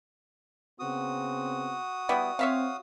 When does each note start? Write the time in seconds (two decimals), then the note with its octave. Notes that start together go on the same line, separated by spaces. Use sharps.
0.79 C#3 B3 C4 F#4 D#6
2.09 G3 B3 E4
2.39 C4 C#5 E5 F5